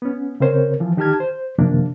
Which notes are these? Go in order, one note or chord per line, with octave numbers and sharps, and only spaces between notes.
B3 C#4
C#3 C4 A#4 C5 C#5
E3 F3
D#3 D#4 G4 A5 F6 G#6
C5
F#2 C3 D#3 F3 A#3 D4